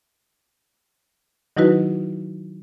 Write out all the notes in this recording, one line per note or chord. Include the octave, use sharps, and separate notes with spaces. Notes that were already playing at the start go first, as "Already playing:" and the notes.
D#3 F#3 D#4 E4 F#4 B4